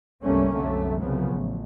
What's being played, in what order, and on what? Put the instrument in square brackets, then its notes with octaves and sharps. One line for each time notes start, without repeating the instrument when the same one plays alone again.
[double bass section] G1 C2 G3 A3 A#3 C#4
C2 F#2 D3 A3
C2 C#3 F3 F#3 B3
A1